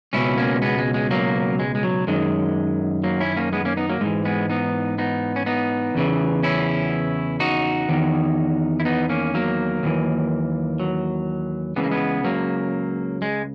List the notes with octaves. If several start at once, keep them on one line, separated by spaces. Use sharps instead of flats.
C#2 B2 C#4 E4
A#3 C#4
G#3 B3
G#3
G#3
F#3 A#3
G#3
G#3
F#3
F#2 D#3 G#3
F#3 A#3
C#4 E4
A#3 C#4
G#3 B3
A#3 C#4
B3 D#4
F#3 A#3
G#2 E3 G#3
G#3 B3
B3 D#4
B3 D#4
C#4
B3 D#4
E2 C#3 E3
C#4 E4
D#4 F#4
E2 D#3
E4
B3 D#4
A#3 C#4
F#3 A#3
D#2 C#3 E3
F#3
C#2 C#3 E3 B3
A#3
G#3 B3
F#3 A#3
G#3